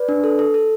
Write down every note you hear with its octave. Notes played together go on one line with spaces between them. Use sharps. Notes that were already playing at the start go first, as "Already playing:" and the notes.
Already playing: B4 D5
D4
A4
A4
A4